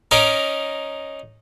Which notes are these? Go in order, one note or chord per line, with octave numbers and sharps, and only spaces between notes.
C#4 D#4 A#4 D6